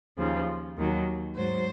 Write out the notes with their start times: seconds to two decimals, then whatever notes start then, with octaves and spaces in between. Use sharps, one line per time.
0.18 D#2 C#3 F3
0.77 D#2 D#3 F#3
1.36 G#2 F#3 C5